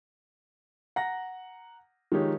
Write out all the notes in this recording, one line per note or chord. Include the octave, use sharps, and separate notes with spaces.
F#5 A#5 A#6
D#3 F3 G#3 D#4 G4 C#5